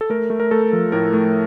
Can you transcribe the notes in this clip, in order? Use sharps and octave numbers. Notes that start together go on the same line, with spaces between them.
A4
A3 A#4
A3
A#4
A3 A4
F3
A2 A#4
A3